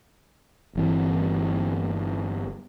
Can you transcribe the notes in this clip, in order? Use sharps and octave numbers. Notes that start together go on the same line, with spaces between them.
G1 E3 C4